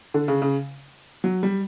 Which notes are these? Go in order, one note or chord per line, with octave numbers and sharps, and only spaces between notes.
D3
C#3
C#3
F#3
G3